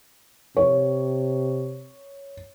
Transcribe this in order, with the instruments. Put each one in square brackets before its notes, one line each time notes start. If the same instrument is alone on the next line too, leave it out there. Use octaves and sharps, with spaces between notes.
[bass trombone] C3 [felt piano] C#5